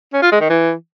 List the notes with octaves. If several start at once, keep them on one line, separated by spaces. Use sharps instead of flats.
C#4
F4
G#3
D#3
E3